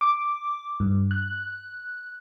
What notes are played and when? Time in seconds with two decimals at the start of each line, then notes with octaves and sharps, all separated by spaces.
0.01 D6
0.80 G2
1.11 F#6